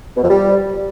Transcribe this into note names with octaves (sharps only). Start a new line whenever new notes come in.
B2
F2
G3